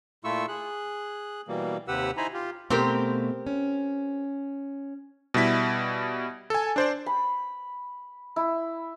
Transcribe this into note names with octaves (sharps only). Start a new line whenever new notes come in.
A#2 A3 E4 F4 C#6 E6
G#4 F#6
B2 E3 G3 A#3
D#2 C3 G4 B4 F#5 E6
D#4 E4 C5 G#5 A#5 B5
F4 G4
B2 A3 C4 G4 A#4
C#4
B2 G3 E4 B6
A4 G#5
D4 C5 D5
B5
E4